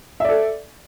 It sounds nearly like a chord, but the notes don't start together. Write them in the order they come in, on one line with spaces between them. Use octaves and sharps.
E5 D5 A4